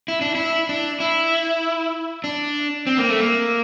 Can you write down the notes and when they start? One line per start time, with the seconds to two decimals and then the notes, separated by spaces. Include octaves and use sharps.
0.08 E4
0.21 D4
0.35 E4
0.69 D4
1.00 E4
2.24 D4
2.87 C4
2.98 A#3
3.08 A3
3.20 A#3